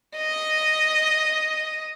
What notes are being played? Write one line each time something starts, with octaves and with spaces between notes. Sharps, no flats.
D#5